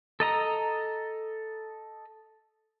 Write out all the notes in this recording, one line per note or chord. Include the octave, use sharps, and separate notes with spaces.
A4 D#5 A#5